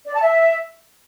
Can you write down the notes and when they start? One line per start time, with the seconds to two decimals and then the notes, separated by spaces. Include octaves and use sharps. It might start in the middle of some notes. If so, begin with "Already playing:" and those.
0.05 D5
0.13 A5
0.21 E5